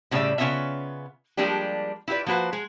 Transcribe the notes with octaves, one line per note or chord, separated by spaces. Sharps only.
A2 C#3 G3 E4 D5 E5
C#3 B3 C#4 F4 D#5 E5
F3 G3 G#3 A#3 D4 G4
E4 F4 G4 B4 D5
F3 A#3 F#4 B4 C5
G#3 G#4